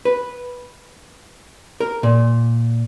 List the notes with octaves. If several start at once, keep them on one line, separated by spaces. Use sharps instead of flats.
B4
A#4
A#2